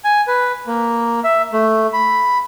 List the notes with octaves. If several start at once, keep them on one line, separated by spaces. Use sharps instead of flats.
G#5
B4
A#3
E5
A3
B5